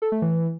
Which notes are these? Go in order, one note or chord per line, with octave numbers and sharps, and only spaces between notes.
A4
A3
E3